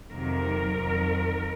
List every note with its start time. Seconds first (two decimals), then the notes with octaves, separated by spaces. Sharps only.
0.11 F2 C3 D#3 F#3 A#4
0.78 F2 D#3 F#3